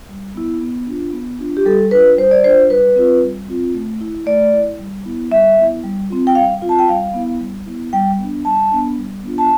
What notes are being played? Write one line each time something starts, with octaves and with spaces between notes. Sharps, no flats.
G3
B3 E4
B3
D4 F4
B3
D4 F4
G4
G3 A4
D4 F4 B4
G3 C5
D5
D4 F4 C5
G3 B4
C4 F4
G3
C4 F4
A3
E4
A3 D5
E4
G3
B3 E4
G3 E5
B3 E4
G3
C4 F4
G5
G3 F5
C4 F4
A5
G5
G3 F5
B3 E4
G3
B3 E4
G3 G5
B3 D4
G3 A5
B3 D4
G3
B3 D4 F4
A5